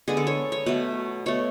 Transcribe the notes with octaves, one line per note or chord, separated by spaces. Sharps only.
D3 G#3 B3 G#4
A4
C#5
C#5
B2 F#3 A3 B4
B2 A3 C#5